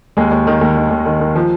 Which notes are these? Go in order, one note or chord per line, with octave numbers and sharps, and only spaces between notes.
D#2 G#3
D#2
D#3
D#2
D#3
D#2
D#3
D#3
F3